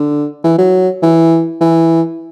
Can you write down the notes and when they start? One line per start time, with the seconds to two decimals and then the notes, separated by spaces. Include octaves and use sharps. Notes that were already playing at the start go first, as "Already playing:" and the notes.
Already playing: D3
0.44 E3
0.58 F#3
1.02 E3
1.61 E3